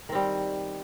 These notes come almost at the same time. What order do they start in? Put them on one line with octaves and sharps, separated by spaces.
D#3 C4 G3